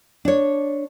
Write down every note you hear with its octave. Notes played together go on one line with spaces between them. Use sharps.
D4 C#5